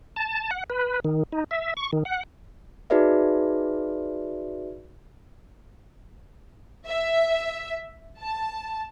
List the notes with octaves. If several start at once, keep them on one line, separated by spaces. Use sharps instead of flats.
A5
F#5
B4
D#3
D#4
E5
C#6
D#3
F#5
D#4 F#4 G#4 B4 D5 E5
E5
A5